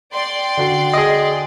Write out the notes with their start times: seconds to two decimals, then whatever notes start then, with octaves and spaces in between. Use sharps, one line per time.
0.13 D5 G5 C6
0.57 D3 F#4 C7
0.93 G#4 D#5